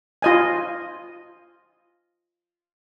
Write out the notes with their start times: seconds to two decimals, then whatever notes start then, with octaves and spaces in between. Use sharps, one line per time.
0.22 F4 D#5 G#5